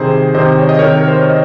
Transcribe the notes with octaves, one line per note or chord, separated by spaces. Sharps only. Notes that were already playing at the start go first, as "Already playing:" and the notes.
Already playing: C3 D#3 G#4 C5
C3 D#3 C5 D#5
C#5
D#5
C3 D#3 A#4 C#5
A#4
C5
C#5
D#5